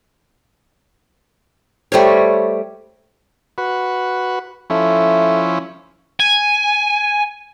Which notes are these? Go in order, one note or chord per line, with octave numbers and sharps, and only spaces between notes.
G3 A3 C5 C#5
F#4 B4
F3 A3 C#4 E4
G#5